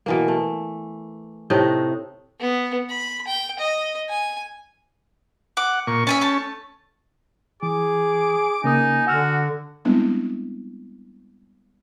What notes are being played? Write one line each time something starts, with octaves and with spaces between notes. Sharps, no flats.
B2 E3 A#3
A3
A2 C3 A3 D#4
B3
B5
G5
D#5
G#5
F#5 D6
A#2 C#6
C#4 E5 G#5 A5
A3 A5
E3 G#4 D6
C#3 A#3 D#4 G#5 D#6
D3 F#4 F#5 E6 F6
G3 G#3 B3 C4 D4 E4